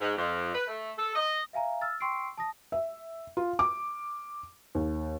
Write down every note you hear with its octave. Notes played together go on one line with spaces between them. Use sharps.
G#2
F2
B4
A3
A4
D#5
E5 F5 G#5 A#5
E6 F6 A6
G5 C6 C#6 E6 C7 D7
A5 D#6 A#6
E5
F4
D6
D#2